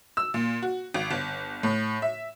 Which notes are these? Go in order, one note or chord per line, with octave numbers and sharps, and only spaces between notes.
E6
A#2
F#4
G#1
G1
A2
E5